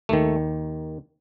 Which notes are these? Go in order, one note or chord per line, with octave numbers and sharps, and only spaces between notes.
D#2 D#3 A3